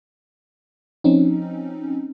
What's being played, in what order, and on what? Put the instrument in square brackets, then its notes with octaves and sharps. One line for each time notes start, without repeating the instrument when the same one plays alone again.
[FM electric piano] F3 C4 C#4 D#4